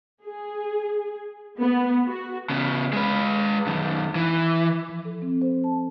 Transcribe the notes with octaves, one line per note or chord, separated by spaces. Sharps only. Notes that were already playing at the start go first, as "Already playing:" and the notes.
G#4
B3
F#4
C#3 B3
G#3 B4
F#2 D#3
E3
F3
A4
C4
C5
A5